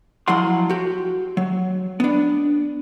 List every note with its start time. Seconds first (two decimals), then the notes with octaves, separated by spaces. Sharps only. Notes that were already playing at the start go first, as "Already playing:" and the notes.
0.28 F3 F#3 E4 F#5 C6
0.69 F#4 G4
1.37 F#3
2.00 B3 D4